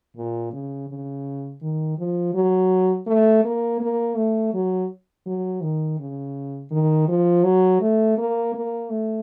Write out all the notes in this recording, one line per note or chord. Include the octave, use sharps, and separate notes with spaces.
A#2
C#3
C#3
D#3
F3
F#3
A3
A#3
A#3
A3
F#3
F#3
D#3
C#3
D#3
F3
F#3
A3
A#3
A#3
A3